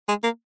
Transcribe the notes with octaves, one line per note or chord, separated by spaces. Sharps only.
G#3
A#3